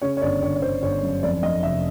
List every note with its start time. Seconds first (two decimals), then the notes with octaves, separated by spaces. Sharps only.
0.02 C#3 C#5
0.17 C#5
0.22 G1 D5
0.42 G1 C#5
0.56 C#5
0.62 G1 C5
0.83 G1 C#5
1.03 F#2
1.23 F2 D5
1.43 F2 D#5
1.63 F1 E5